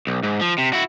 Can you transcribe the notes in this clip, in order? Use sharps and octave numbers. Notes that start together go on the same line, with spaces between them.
B1
G#2
F3
C3
E4 F#4